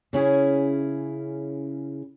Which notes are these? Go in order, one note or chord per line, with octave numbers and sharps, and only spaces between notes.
C#3 C#4 E4 G#4